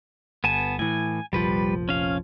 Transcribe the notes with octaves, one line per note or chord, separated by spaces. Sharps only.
G1 B3 G#5 A5
A2 E3 G#5
F1 A#1 F3 G3 B4
C#4 F5